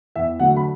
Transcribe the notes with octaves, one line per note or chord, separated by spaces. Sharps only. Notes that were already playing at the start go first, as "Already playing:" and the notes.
E2 E5
D3 F#3 A3 F#5
B5